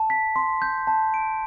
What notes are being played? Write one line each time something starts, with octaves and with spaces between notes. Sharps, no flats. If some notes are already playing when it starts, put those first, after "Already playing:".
Already playing: A5
B6
C6
G6
A5
D7